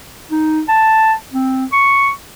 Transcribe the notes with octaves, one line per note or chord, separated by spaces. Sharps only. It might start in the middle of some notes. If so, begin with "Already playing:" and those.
D#4
A5
C4
C#6